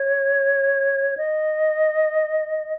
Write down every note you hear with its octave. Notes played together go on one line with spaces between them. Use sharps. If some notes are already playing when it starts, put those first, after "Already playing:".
Already playing: C#5
D#5